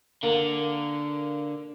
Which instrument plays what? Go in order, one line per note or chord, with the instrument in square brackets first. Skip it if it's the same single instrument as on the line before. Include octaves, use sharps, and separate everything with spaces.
[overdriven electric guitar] D3 [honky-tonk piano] A#3